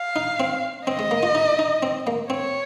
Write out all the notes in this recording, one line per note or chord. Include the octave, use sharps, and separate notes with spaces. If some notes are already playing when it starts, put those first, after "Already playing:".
Already playing: F5
D#4
C4
C4 D#5
G#3
A#3
F4
D#4
D#4
C4
A#3
C4 C#5